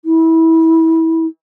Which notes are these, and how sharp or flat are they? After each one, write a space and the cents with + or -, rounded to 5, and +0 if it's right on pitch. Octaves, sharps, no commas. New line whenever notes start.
E4 -25